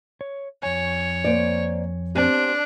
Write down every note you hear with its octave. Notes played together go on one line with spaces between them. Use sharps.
C#5
F2 C#5 G#5
A#3 C5 D5
B3 C4 D4 G4